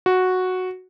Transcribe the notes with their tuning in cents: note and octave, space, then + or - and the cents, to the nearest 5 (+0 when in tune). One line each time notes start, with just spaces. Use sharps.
F#4 -5